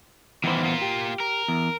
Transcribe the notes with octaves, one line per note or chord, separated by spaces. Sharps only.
E2 D#3 E3 B3 C5
A#3 F4
G4
A#4
E2